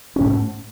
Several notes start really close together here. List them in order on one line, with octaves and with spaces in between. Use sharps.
C#4 G#2 A3